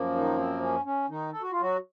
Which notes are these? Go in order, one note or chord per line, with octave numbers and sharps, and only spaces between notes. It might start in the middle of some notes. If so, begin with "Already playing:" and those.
Already playing: F#2 F3 A#3
D#3 D#4
C4
C#4
C#4
D#3 D#4
A4
F#4
F4
F#3 F#4